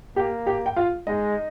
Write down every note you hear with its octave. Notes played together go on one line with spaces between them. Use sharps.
A#3 G4 G5
G4 G5
G5
F4 F5
G#3 D#4 D#5